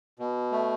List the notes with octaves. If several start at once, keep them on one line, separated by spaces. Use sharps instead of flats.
B2
A3